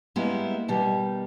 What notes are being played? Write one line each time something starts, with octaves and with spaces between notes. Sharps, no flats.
G3 G#3 A#3 B3 E4
B2 D#3 G3